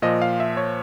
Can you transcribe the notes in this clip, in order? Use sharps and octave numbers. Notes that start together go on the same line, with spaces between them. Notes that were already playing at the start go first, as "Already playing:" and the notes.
A#2 F3 D#5
F5
E5
C#5